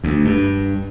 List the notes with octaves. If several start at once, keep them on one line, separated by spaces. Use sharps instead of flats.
D2
G2